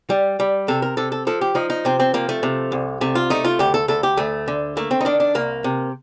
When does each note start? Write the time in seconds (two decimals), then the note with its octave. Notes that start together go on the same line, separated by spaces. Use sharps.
0.10 G3
0.40 G3
0.68 C3 A4
0.82 A#4
0.97 C3 A4
1.12 A4
1.27 F3 A4
1.41 G4
1.55 F3 D#4
1.70 D#4
1.85 C3 C4
2.00 C4
2.14 F3 A#3
2.29 A3
2.43 C3
2.72 C2
3.01 C3 A3
3.15 F4
3.30 A3 D#4
3.45 F4
3.59 D2 G4
3.74 A4
3.88 D2 A4
4.03 G4
4.17 D2 A3
4.48 D3
4.77 A3 A#3
4.91 C4
5.01 D#4
5.05 D#3 D4
5.20 D4
5.35 C2 A#3
5.64 C3